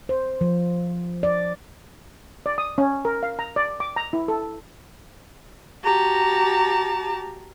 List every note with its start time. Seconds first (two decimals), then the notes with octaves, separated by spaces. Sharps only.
0.09 C5
0.41 F3
1.23 D5
2.46 D5
2.58 D#6
2.78 C#4
3.05 A#4
3.23 F5
3.39 A#5
3.56 D5
3.80 D6
3.96 A#5
4.13 E4
4.28 A4
5.83 F#4 G4 A5 A#5